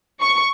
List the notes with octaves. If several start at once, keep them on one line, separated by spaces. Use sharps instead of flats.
C#6